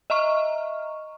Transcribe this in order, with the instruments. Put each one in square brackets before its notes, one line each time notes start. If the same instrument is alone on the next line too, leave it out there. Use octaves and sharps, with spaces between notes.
[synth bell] D#5 E5 A#5 C#6 F6